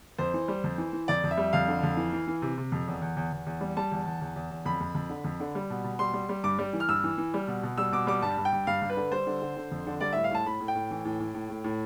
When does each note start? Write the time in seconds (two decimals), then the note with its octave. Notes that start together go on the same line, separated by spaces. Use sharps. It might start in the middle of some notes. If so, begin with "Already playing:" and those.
0.18 F2 C5
0.34 E3
0.48 G3
0.64 F2
0.78 E3
0.93 E3
1.08 F2 D5
1.24 F2
1.31 E5
1.38 G3
1.53 F2 F5
1.68 D3
1.83 F2
1.97 E3
2.13 E3
2.27 E3
2.42 C3
2.58 C3
2.72 F2
2.87 E2
3.02 E2
3.17 E2
3.32 E2
3.46 E2
3.61 G3
3.77 G3 A5
3.91 E2
4.05 E2
4.21 E2
4.36 E2
4.51 E2
4.66 F2 B5
4.81 F2
4.95 F2
5.10 D3
5.24 F2
5.40 D3
5.55 G3
5.70 B2
5.84 B2
5.99 G3 C6
6.14 G3
6.29 G3
6.44 G2 D6
6.59 G3
6.73 E3
6.80 F6
6.89 G2 E6
7.04 E3
7.18 E3
7.34 G3
7.48 B2
7.63 B2
7.78 G3 E6
7.92 B2 D6
8.07 G3 D6
8.22 G2 A5
8.38 G2
8.45 G5
8.53 G2
8.67 G2 F5
8.82 G2
8.90 B4
8.97 D3
9.12 G3 C5
9.27 D3
9.42 D3
9.57 D3
9.71 F2
9.87 D3
10.01 G3 D5
10.13 A2 E5
10.24 F5
10.31 A2 A5
10.46 A2 B5
10.60 A2
10.68 G5
10.75 A2
10.91 E3
11.05 A2
11.20 A2
11.34 A2
11.50 A2
11.64 A2